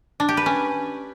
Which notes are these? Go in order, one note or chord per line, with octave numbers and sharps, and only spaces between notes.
D4
G4
B4
C#4